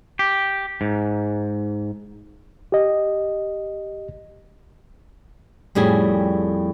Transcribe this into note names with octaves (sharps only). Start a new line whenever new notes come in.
G4
G#2
G4 D#5
F2 A2 G3 C#4 G#4